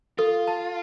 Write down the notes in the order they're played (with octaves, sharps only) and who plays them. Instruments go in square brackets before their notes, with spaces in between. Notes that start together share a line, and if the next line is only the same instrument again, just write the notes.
[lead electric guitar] F4 [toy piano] A4
[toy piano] A5